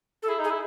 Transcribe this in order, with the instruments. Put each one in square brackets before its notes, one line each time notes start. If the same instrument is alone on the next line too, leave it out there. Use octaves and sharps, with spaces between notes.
[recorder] A4
[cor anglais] E4 [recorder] G#4
[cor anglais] D#4
[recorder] G#4
[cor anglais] E4